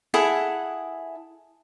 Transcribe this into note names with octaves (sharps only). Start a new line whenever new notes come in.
E4 G#4 A4 F#5